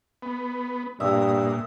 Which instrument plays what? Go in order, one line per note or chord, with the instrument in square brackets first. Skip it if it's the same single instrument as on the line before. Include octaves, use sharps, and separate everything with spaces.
[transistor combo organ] B3
[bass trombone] G2 [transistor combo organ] A#2 [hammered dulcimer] E5 [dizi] D#6